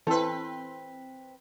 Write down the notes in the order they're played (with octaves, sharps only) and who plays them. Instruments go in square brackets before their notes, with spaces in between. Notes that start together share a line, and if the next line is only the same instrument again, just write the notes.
[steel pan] E3 A4 [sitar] C4 B4